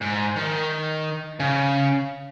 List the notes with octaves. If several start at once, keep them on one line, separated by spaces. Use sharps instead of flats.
G#2
D#3
C#3